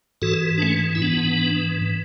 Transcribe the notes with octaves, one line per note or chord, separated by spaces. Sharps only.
G#2 E3 F#4 A4
D4
A3 C#4
E4
G#2 E3 B3 D4
E3